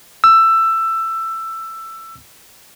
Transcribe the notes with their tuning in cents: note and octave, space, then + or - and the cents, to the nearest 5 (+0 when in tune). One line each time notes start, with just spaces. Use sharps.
E6 +15